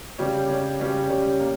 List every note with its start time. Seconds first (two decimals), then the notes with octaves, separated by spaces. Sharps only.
0.18 C#3 G3 C#4 G4 C#5
0.49 C#3 G3 C#4 G4 C#5
0.79 C#3 G3 C#4 G4 C#5
1.09 C#3 G3 C#4 G4 C#5
1.40 A#3